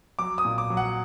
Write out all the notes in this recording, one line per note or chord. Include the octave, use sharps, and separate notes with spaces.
F#3 D6
D#6
A#2
D6
F#3
F#5